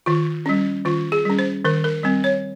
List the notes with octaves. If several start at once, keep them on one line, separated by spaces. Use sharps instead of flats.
D#3 F4
G3 C#4
D#3 F4
G#4
G3 C#4
C5
D#3 A#4
A#4
G3 C4
C#5